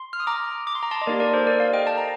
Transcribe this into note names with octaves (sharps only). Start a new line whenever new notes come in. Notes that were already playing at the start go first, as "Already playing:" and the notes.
Already playing: C6
F6
D#6
A#5 D6
D6
C6
A#5
A5 C6
D#5
A#3 D#4 G4 A#4 D5
A#4 D5
A4 C5
A#4 D5
D5 F5
D#5 G5
A5
A#5